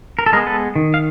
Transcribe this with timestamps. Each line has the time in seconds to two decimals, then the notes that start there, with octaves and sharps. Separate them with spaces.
0.19 A#4
0.26 A4
0.33 G#3 B3 G#4 A#4
0.47 A4 B4
0.76 D#3
0.94 F5